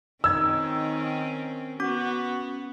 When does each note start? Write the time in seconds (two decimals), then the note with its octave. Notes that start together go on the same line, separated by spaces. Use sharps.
0.24 D#3 C4 C#4 D#4 E6 G#6
1.80 B3 C#4 F#4 D6